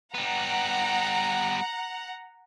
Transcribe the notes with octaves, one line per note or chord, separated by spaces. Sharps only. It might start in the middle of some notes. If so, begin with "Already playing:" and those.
G3 B3 F#5 A#5